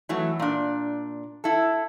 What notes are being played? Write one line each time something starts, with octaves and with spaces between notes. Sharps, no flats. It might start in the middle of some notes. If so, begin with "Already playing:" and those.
E3 F#3 A3
A#2 D4
E4 A4